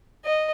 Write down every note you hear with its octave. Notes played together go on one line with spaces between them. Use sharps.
D#5